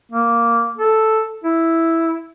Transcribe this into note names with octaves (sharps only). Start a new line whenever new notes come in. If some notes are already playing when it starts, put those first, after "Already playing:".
A#3
A4
E4